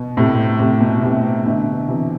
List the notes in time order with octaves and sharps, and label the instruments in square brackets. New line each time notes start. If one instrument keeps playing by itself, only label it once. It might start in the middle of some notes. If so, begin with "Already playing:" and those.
Already playing: [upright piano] B2
A2 C3
A2 C3
B2
A2 C3
B2 D3
C3 E3